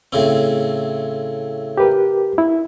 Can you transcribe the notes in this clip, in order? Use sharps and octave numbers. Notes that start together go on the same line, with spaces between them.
A2 C#3 C4
G4 A#4 B4
E4